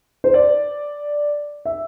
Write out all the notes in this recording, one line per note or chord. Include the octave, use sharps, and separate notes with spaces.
C5
D5
E5